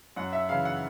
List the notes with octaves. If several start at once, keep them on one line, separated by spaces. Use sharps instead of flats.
F#2 F#5
E5
C#3 E3 F5
F#5